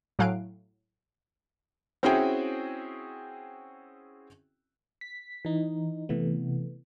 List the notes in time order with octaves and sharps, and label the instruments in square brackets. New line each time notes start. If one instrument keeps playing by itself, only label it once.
[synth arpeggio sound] A2 F#3 F5 G#5 F#6 D7
[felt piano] C4 C#4 E4 F#4 G#4 G5
[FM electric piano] B6
E3 D#4
C3 E3 A3 B3